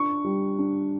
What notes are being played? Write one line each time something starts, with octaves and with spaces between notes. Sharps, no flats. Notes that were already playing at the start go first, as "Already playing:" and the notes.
Already playing: D4 C#6
G3
D4